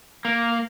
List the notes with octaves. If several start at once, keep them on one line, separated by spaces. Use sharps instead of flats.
A#3